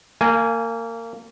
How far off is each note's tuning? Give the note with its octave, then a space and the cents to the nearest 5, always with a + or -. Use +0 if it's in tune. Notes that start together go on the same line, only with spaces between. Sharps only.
A#3 -25 F5 +0 G#5 +10